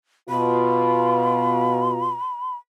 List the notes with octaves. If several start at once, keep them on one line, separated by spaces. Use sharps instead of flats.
B2 F4 B5